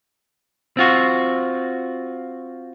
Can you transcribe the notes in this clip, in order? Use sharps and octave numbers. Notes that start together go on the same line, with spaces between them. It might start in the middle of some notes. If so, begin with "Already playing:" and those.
C4 F4 F#4